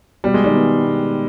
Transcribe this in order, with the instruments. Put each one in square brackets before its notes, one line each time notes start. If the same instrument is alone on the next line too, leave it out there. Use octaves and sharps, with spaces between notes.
[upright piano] B2 [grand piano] G3
[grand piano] G#3
D#3 G3
[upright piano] G#3 B3
B2